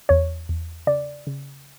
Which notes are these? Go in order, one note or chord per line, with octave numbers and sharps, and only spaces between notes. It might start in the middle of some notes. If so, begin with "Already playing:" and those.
E2 C#5
E2
C#3 D5
C#3